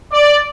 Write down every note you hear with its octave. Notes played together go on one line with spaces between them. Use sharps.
D5